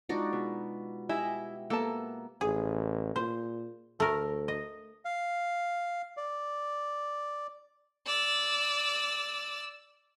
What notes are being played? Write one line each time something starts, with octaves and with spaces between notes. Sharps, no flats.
G#3 D4 D#4 F4 F#4
B2
E4 G4 D#5 E5 G#5
A#3 B3 A4 A5
A1 G#4
A#2 C5
D2 A3 A#4
D#5
F5
D5
D5 E6